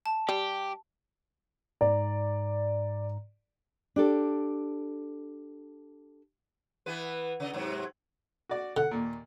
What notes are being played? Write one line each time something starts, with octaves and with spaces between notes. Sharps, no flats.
A5
G3 G4
G#2 D5 A#5
D4 G4 A4
E3 B3 B4
C#3 D#5
G#2 C3 F#3
F#4 D5
D3 F#5
D#2 A#2